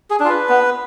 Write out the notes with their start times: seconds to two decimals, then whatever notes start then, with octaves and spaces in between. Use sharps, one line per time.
0.10 G#4
0.20 D4
0.25 F4 B4
0.49 B3